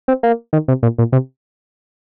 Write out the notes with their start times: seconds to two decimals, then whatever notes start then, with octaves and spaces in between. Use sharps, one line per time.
0.08 C4
0.23 A#3
0.53 D#3
0.68 C3
0.83 A#2
0.98 A#2
1.12 C3